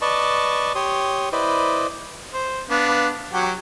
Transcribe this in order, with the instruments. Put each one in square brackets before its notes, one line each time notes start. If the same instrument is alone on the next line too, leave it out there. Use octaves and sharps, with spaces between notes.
[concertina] B4 D5 D#5 A5 C#6
G4 C#5 C6 D#6
E4 B4 C5 D5 D#5
[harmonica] C5
B3 D4 F5
F#3 G4 F#5